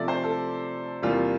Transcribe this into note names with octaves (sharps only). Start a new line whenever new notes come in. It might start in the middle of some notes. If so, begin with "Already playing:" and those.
Already playing: C3 F3 A3 D5 E5
C5
A4
E2 C3 G3 A#3 F4